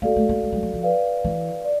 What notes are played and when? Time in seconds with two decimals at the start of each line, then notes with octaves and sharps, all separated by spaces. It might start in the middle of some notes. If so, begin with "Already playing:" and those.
0.02 A#3 F#4 A4 D5 F5
0.16 A3
0.29 A#3
0.43 G#3
0.52 G3
0.63 F#3
0.74 F3
0.83 B4 D5 F5
1.24 E3
1.65 D5